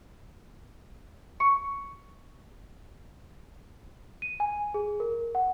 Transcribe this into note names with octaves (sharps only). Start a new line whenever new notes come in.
C#6
D#7
G#5
G#4
A#4
F#5